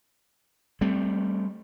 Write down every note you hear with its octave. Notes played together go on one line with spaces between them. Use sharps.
G3 A3 C4